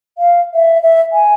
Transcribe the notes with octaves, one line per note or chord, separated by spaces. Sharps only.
F5
E5
E5
G#5